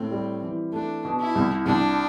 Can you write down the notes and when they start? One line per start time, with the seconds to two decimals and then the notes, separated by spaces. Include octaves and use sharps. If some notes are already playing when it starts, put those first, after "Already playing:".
Already playing: A2 C4
0.11 G3
0.42 E3
0.72 A3 D4
1.05 B2
1.20 E4
1.35 C2
1.66 C2 D4